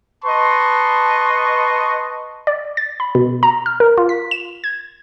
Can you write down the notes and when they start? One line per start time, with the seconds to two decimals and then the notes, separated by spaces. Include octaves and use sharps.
0.25 B4 D#5 A5 C6 C#6
2.47 D5
2.77 A6
3.00 B5
3.15 B2
3.43 A#5
3.66 F6
3.80 A#4
3.98 F4
4.09 B6
4.31 E7
4.64 G#6